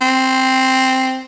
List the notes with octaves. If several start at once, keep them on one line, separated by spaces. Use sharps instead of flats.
C4